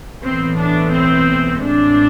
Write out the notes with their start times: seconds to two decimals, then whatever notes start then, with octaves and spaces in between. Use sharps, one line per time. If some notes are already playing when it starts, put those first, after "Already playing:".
0.23 B1 A2 E3 B3 C4
0.56 D4
0.91 C4
1.58 A1 A2 G#3 C4 D4